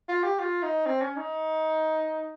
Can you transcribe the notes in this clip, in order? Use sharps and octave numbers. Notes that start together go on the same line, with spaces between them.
F4
G4
F4
D#4
C4
C#4
D#4